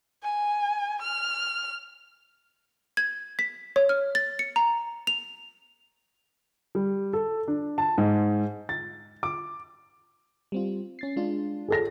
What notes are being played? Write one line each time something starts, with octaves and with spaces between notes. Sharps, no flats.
G#5
F6
G#6
B6
C#5
F6
A6
C#7
A#5
F7
G3
A4
D4
A5
G#2
A6
D6
G3 C4 F4
C#4 A6 C7
G#3 D4 F4
G#4 A4 A#6